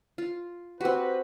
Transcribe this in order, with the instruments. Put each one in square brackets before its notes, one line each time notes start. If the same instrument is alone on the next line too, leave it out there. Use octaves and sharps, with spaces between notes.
[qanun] F4
[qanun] C4 F#4 [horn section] G4 B4